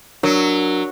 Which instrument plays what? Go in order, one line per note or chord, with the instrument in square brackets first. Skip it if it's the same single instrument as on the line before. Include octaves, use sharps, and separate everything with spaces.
[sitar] F#3 [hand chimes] D4 A#4 E6